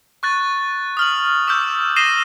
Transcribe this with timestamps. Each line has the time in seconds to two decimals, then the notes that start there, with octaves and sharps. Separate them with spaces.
0.23 C#6 F#6 A6
0.97 D#6 F6 F#7
1.47 D6 E6 F6 G6
1.96 D#6 A#6 C7 D#7 E7 G7